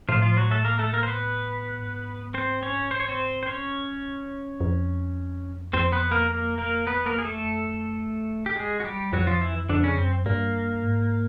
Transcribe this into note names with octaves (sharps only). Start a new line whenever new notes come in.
A2 F3 F4
F3 F4
F#3 F#4
A3 A4
A#3 A#4
A3 A4
A#3 A#4
C5
B3 B4
G#2
C4 C5
C#4 C#5
C5
C#5
C4 C5
C5
G2 C#4 C#5
F2
F2 C4 C5
B3 B4
A#3 A#4
A#3 A#4
A#3 A#4
B3 B4
A#3 A#4
G#4
A3 A4
F#2
F2
G4
G#3 G#4
F#4
G3 G4
F2 F#3 F#4
F3 F4
E3 E4
F2 D3 D4
C#3 C#4
F#2 C4
G2 A#3
G#2